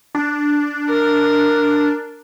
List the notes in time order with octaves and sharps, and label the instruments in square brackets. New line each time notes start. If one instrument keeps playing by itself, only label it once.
[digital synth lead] D4
[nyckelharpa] A#4